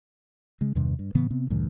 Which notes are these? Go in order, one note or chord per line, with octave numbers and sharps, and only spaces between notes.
C#3 G#3
E2 G2 C3 D#3
G2
A2 C#3 E3 B3
C3 B3 C4
D2 G2 A#2 E3